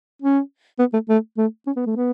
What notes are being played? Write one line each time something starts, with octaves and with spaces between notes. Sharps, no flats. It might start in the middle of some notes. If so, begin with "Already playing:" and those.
C#4
B3
A3
A3
A3
C#4
B3
A3
B3